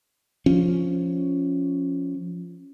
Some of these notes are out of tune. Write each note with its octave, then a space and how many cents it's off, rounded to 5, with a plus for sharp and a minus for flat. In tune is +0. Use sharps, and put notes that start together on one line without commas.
F3 +0 C#4 +0